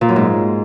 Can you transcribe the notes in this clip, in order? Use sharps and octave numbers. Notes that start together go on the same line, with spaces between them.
A#2
F#2
G#2